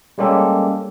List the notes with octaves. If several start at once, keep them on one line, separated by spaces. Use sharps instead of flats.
G3 G#3 A#3 C#4 G4 A4